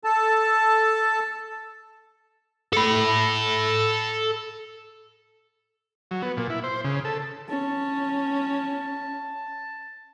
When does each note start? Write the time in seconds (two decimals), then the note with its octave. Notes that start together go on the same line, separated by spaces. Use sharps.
0.04 A4 A5
2.73 A4 B5
6.11 F#3
6.22 B3
6.37 A#2
6.50 E4
6.64 C5
6.84 C#3
7.05 A4
7.49 C#4 A5